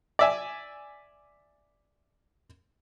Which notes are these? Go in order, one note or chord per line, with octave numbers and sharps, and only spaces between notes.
D5 E5 G#5